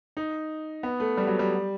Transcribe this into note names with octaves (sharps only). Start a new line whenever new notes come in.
D#4
B3
A3
G3
F#3
G3